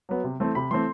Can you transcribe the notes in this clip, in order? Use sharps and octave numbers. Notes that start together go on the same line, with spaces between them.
F#3 B3
C3
E3 A3 C4
C3 B5
E3 A3 C4 C6